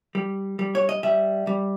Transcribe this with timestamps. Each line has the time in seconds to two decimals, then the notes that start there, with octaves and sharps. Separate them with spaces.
0.15 G3
0.59 G3
0.75 C#5
0.89 D#5
1.03 G3 E5
1.47 G3